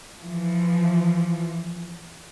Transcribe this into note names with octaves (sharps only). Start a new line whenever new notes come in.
E3 F3